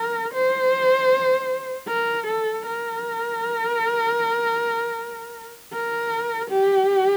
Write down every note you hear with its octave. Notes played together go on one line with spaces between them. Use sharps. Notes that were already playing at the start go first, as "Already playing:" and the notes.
Already playing: A#4
C5
A#4
A4
A#4
A#4
G4